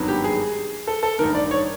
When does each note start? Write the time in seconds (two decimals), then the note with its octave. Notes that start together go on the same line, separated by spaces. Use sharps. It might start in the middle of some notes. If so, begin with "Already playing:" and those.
Already playing: G#1 G2 D#3 F#3 B3
0.08 G4
0.24 G#4
0.87 A4
1.03 A4
1.19 A1 G2 D#3 A#4
1.35 D5
1.51 C#5